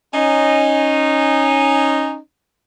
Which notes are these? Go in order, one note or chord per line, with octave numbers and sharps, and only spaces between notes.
C#4 D#4